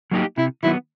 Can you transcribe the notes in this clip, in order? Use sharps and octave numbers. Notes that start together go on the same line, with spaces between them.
F#3 A#3 D#4 G4
C3 E4
D#3 F#3 B3 E4